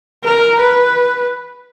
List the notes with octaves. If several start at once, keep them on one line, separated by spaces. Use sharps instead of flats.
A#4
B4